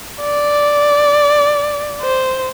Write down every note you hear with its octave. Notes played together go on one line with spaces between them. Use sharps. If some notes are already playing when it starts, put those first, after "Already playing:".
D5
C5